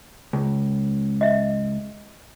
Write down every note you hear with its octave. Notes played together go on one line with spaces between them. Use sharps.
C#2
D#5 E5